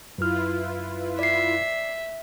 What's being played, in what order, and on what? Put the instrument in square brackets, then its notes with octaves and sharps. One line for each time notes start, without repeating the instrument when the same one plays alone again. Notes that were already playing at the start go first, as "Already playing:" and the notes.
[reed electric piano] F#2 F6 [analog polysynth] E4 F4 B4
[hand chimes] D5 C7 [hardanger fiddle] E5